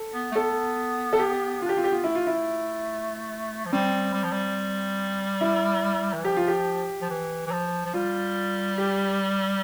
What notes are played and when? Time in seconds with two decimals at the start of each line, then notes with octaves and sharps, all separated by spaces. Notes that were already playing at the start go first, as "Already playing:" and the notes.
Already playing: A4
0.14 B3
0.32 A3
0.35 B3 A4
1.13 A4
1.19 G4
1.62 F4
1.65 D4 G4
1.77 C4 F4
1.84 G4
1.91 B3 F4
2.04 A3 E4
2.15 F4
2.27 E4
3.65 F3
3.72 G3 C4
4.14 G3
4.23 F3
4.32 G3
5.41 E4
6.13 E3
6.25 F3 G4
6.36 F4
6.47 G4
7.02 F3
7.10 E3
7.47 E3
7.52 F3
7.85 F3
7.93 G3 F4
8.78 G4